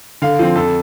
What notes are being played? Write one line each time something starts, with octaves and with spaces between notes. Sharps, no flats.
D3 F5
F3 C4
F2 A4